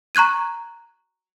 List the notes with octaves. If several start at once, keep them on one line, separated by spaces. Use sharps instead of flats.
A#5 C#6 F#6 G#6 D#7